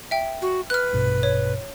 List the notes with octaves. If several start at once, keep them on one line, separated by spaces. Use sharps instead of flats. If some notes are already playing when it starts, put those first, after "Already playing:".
E5 G5
F#4
B4 F6 F#6
A#1 G2 B2
C#5